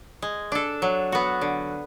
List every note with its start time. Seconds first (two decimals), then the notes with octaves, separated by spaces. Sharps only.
0.22 G#3
0.52 D4 A4
0.82 F#3
1.12 B3 F#4
1.41 D3